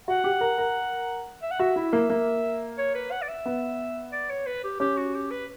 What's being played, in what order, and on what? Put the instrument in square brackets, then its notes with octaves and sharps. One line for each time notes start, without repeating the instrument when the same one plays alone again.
[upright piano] F#4 [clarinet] F#5
[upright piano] G4
A#4
A#4
[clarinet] E5
F#5
[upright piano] F#4 [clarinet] E5
[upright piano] E4
A#3
A#3
[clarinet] C#5
B4
F#5
D5
E5
[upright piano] B3
[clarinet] D5
C#5
B4
G4
[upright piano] C#4 [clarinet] G4
[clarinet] F#4
G4
B4